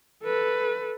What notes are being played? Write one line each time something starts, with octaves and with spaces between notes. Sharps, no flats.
A4 B4